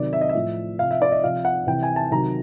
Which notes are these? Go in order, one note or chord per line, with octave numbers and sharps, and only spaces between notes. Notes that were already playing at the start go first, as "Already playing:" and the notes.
Already playing: C3 D#3 F#3 D5
E5
D#5
E5
A2 F3
C3 F3 F5
E5
D5
D#5
C3 F3 F5
F#5
C3 E3 G5
G#5
A5
C3 D#3 F#3 A#5